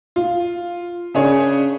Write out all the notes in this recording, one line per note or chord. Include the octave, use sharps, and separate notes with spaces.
F4
C#3 D4 G#4 C#5